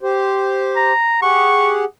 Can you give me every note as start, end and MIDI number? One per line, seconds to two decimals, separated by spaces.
0.01 0.92 67
0.01 0.92 72
0.76 1.17 82
1.22 1.85 67
1.22 1.85 68
1.22 1.85 78
1.22 1.71 85